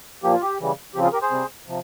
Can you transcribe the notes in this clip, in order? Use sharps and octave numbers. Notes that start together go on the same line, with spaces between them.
A#2 F3 A#3 G4
F4
G4
C#3 E3 G3
C#3 F3 C4 G4
F4 G#4
G4 A#4
G#4 C5
C3 G3 C4
C3 F3